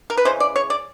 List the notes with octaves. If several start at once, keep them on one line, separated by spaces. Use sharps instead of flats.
A#4
B4
C#3 E3 G#3 C#4 C5
D5
C#5
D5